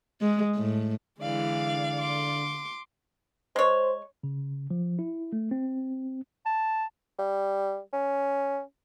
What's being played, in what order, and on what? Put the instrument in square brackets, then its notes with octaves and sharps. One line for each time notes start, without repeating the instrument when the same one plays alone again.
[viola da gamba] G#3
A2
[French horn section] D3 [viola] E3 G#3 [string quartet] D5 F5
[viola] C6 D6
[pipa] G#3 C#5 [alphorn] C5
[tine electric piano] C#3
F3
E4
A3
C4
[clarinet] A5
[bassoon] G3
C#4